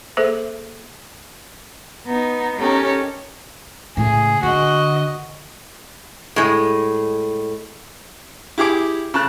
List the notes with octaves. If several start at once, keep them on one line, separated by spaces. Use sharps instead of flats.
A#3 G#4 A4 C5 E5
B3 D#4
C#4 D#4 G4 A4 A#4
A2 C#3 G#4
D3 F#4 D#5
A2 G#3
E4 G4 G#4 D6
C#3 A5 F#6